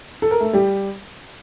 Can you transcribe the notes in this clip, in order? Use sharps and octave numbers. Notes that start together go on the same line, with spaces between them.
A4
A#4
A3 A4
G3 G4